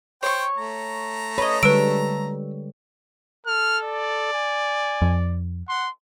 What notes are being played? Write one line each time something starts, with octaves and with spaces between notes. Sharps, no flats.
C5 C#5 G5 C#6
A3 A#5
B4 C#5 D#5
D3 G3 G#3 B4 E6 D7
A4 F6
D5
G#5
F2
F#5 C6